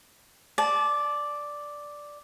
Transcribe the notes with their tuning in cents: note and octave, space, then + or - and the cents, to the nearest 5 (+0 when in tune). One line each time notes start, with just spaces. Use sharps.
D5 +0 A5 -30